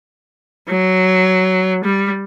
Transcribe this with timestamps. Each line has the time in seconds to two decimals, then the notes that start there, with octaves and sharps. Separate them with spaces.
0.69 F#3
1.85 G3